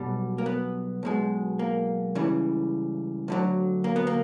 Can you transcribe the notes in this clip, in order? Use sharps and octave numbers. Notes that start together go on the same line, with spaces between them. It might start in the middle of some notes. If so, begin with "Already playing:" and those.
Already playing: B1 B2 G3
A#3
B3
B1 B2 G#3
A#3
C#2 C#3 E3 G3
D2 D3 F#3
A#3
B3
A#3